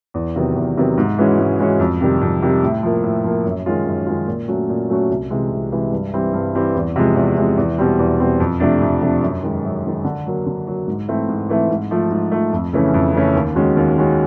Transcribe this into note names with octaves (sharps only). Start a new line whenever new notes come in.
E2
C3 D#3 F#3 B3
E2
C3 D#3 F#3 B3
G#2
E3 G#3 C#4 F#4
G#2
E3 G#3 C#4 F#4
F2
C3 D#3 G3
F2
C3 D#3 G3
A2
F3 A#3
A2
F3 A#3
F#2
D#3 G#3 C#4 F4
F#2
D#3 G#3 C#4 F4
A#2
F#3 A3 C#4 F#4
A#2
F#3 A3 C#4 F#4
C2
C3 E3 G#3
C2
C3 E3 G#3
G2
E3 G3 C4 E4
G2
E3 G3 C4 E4
E2
C3 F3 G#3
E2
C3 F3 G#3
E2
B2 G3 C4
E2
B2 G3 C4
F2
C3 F3 A3 D4
F2
C3 F3 A3 D4
F#2
D#3 G#3
F#2
D#3 G#3
D3
F#3 A#3
D3
F#3 A#3
G#2
E3 A3 C4 E4
G#2
E3 A3 C4 E4
G#2
F3 A3
G#2
F3 A3
F2
C#3 E3 A3 C#4
F2
C#3 E3 A3 C#4
D#2
D#3 G#3 C#4 F#4
D#2
D#3 G#3 C#4 F#4